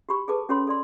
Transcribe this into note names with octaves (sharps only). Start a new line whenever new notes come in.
F#4 G4 B5 C#6
G#4 A4 B4 A5 D6
C#4 F#4 A4 C#5 B5 C6
A4 D5 C6